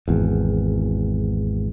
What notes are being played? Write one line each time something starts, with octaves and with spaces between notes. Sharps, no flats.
G#1 E2